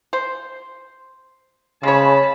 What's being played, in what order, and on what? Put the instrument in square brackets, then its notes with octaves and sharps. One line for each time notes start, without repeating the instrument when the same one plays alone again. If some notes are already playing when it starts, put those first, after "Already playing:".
[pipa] C5
[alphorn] C#3 [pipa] G#3 C#5 [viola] A5 B5